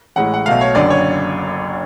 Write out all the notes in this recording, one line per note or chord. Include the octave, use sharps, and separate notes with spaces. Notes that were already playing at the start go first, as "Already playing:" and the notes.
A1 A2 G#3 F#5
F#5
B1 B2 A3 F5
C#5
F#1 F#2 D3 D5
C#5